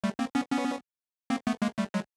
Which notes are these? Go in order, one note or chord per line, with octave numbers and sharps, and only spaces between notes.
G3 A3
A#3 C4
B3 C#4
B3 C#4
A#3 C4
A3 B3
G#3 A#3
G3 A3
F#3 G#3